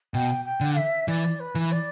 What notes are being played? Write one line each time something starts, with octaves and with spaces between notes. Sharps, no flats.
B2 G5
G5
D3
E5
E3 D5
B4
E3
D5